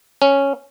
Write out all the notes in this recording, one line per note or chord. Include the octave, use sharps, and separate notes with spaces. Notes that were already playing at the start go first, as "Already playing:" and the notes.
C#4